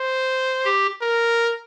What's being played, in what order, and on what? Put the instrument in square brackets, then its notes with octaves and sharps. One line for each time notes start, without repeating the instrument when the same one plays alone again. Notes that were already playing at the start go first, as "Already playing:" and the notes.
Already playing: [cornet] C5
[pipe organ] G4
[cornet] A#4